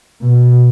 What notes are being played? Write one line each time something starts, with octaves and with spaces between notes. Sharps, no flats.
B2